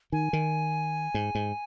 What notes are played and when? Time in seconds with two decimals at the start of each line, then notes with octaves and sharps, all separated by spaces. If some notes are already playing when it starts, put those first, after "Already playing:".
0.12 D#3 G#5
0.33 D#3
1.14 G#2
1.35 G#2